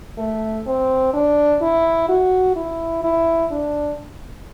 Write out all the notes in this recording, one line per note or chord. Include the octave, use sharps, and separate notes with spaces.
A3
C4
D4
E4
F#4
E4
E4
D4